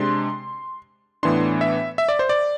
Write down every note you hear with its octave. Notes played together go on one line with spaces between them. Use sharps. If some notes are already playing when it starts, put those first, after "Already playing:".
Already playing: C3 G#3 D4 C6
A2 E3 B3 D4 C6
E5
E5
D5
C5
D5